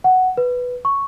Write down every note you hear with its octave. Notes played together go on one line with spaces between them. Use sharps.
F#5
B4
C#6